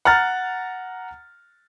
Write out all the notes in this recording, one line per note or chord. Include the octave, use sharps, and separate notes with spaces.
F#5 A#5 F6 A6